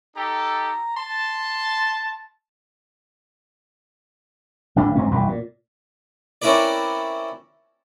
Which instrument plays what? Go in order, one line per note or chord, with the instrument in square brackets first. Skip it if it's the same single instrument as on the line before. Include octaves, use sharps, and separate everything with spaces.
[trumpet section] D#4 G4 A4 [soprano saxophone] A#5
[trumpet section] A5 [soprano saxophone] C6
[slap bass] D1 G#1 A2 D4
G1 G#2 C4 C#4
E1 C2 F#2 A#2
A#2
[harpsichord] C4 C#4 E4 A#4 B4 D5